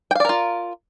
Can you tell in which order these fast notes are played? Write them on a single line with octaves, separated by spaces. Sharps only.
G5 F5 D5 A#4 F4